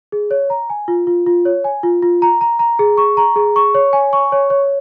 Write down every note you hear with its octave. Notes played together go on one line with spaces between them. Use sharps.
G#4
C#5
A#5
G#5
F4
F4
F4
C#5
G#5
F4
F4
A#5
A#5
A#5
G#4
C#6
A#5
G#4
C#6
C#5
G#5
C#6
C#5
C#5